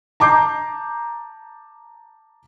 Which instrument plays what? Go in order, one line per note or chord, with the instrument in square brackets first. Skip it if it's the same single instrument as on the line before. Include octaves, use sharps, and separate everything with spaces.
[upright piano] A5 A#5 D6 G6 C7